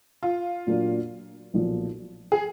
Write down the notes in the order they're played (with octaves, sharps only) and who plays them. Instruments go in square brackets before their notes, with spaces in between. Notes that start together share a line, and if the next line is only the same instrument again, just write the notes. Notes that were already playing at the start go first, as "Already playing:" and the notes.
[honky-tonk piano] F4
[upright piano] A#2 F#3 A#3 D4
B1 A#2 F3
[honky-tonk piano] G#4